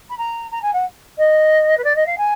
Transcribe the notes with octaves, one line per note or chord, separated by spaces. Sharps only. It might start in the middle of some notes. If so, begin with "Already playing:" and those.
B5
A#5
A#5
G#5
F#5
D#5
B4
D5
D#5
F5
G#5